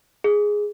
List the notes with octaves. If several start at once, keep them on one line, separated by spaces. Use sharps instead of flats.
G#4